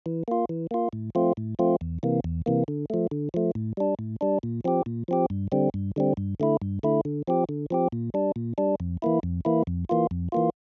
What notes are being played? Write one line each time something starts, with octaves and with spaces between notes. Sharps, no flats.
E3
A#3 F4
E3
A#3 F4
A2
F3 A3 C4 F4
A2
F3 A3 C4 F4
E2
C3 E3 A#3
E2
C3 E3 A#3
D3
F3 A3
D3
F3 A3
A2
G3 D4
A2
G3 D4
A#2
F3 C4 G4
A#2
F3 C4 G4
G2
D3 G3 C4
G2
D3 G3 C4
G2
D3 A3 E4
G2
D3 A3 E4
D3
F3 C4 G4
D3
F3 C4 G4
A#2
G3 D4
A#2
G3 D4
F2
E3 A#3 E4
F2
E3 A#3 E4
F2
E3 A#3 F4
F2
E3 A#3 F4